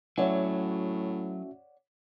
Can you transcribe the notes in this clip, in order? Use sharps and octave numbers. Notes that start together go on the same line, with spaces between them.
A2 F#3 C#4 F#4 C#5 D5 E5 F#5